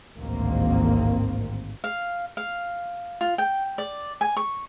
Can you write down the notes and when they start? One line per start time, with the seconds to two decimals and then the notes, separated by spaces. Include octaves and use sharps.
0.17 A1 D2 G#2 D#3 A#3 C4
1.84 F5
2.37 F5
3.21 F4
3.38 G5
3.78 D5
4.21 G#5
4.37 C#6